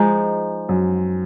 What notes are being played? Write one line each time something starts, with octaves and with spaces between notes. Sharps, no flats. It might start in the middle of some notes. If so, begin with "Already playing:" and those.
Already playing: F3 G#3 D#4
F#2